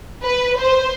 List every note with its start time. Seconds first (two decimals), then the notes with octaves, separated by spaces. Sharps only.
0.24 B4
0.58 C5